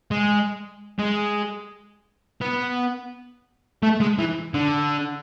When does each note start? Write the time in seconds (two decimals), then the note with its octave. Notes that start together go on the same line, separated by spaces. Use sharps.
0.11 G#3
0.99 G#3
2.41 B3
3.83 A3
4.01 G#3
4.19 E3
4.54 D3